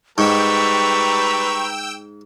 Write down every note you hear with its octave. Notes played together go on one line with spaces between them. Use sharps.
G#2 G3 B4 G5 A#5 C#6 E6